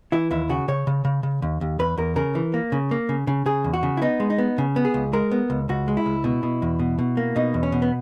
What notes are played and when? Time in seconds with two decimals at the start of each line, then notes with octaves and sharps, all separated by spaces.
0.12 E3 E4
0.31 D#2 E4
0.49 C#3 F#4
0.68 C#3 C#5
0.87 C#3
1.05 C#3
1.23 C#3
1.42 D#2
1.61 D#2
1.79 E2 B4
1.98 E2 A#4
2.16 C#3 A#4
2.35 E3
2.54 A#3
2.72 C#3
2.91 A#3
3.09 C#3
3.27 C#3
3.46 C#3 G#4
3.64 E2
3.74 F#4
3.83 C#3
3.97 E4
4.02 B3 D#4
4.20 G#3
4.30 D#4
4.38 B3
4.58 C#3
4.76 B3
4.85 G#4
4.94 C#2
5.13 G#3 A#4
5.32 B3
5.50 C#2
5.69 C#2 F#4
5.88 G#3
5.97 E4
6.06 C#2
6.24 B2
6.43 B2
6.62 E2
6.79 B2
6.99 B2
7.17 A#3
7.36 B2 D#4
7.54 E2
7.63 C#4
7.72 B2
7.82 B3